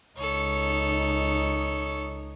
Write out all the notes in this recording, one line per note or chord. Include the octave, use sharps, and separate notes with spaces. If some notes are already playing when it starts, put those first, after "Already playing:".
C#2 D#4 A4 C#5